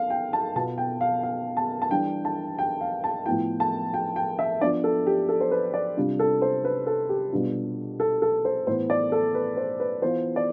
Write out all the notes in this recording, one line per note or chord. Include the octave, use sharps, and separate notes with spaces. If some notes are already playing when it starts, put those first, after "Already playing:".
Already playing: B3 F5
G5
A5
B2 B3 F4 A5
G5
F5
F5
A5
A5
E3 G3 D4 G5
A5
G5
F5
A5
A2 F3 B3 E4 G5
A5
G5
G5
E5
F3 B3 D4 D5
A4
G4
A4
C5
B4
D5
C3 G3 D4 F4
A4
C5
B4
A4
G4
B2 G3 D4 F4
A4
A4
C5
A2 E3 B3 C5
D5
A4
B4
C5
B4
E3 B3 F4 C5
D5